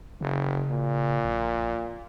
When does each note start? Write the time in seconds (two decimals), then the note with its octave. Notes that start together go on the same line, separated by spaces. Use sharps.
0.21 F#1 C#3
0.70 A#2
1.25 A#1